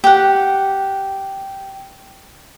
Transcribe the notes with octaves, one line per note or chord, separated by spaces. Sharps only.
G4 F#5